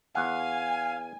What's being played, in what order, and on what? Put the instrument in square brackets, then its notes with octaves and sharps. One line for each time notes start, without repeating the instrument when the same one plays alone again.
[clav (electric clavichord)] E2 F#5 [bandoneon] F5 [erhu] G#5